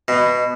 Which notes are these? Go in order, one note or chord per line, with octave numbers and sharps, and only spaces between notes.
B2